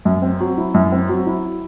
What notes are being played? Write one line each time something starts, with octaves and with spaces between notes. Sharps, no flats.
F#2
C4
F#3
E4
F#2
C4
F#3
E4